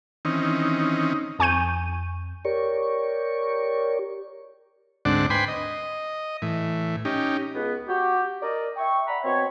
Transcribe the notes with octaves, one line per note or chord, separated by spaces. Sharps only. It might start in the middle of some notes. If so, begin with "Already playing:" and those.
D#3 E3 C4 C#4 D#4
F2 G#5 C#6 G6 D#7
G4 A#4 C#5 D5 C#6
D2 G#2 C4 D4 D5 F#5
B4 C5 G5 G#5 B5 C6
D#5
A2 E3
C#4 D#4 G4
C#2 B3
F#4 G4
A#4 D5 D#5
E5 G5 C#6
D5 E5 F#5 A#5 B5
B2 C4 C#5